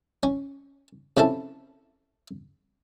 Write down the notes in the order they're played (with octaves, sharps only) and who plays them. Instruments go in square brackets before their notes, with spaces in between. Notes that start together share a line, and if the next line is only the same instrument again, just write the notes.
[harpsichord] C#4
C3 F3 C#4 E4 A4